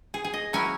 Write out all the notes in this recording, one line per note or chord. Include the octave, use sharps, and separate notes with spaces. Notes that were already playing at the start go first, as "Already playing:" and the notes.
G#4
G#4
D#5
F#3 C#4 E4 G#5